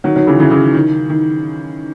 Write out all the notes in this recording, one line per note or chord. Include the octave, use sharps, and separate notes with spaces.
D#3 F#3
D#3 F#3
C#3 E3
C#3 E3
C#3 E3
D#3
D#3
D#3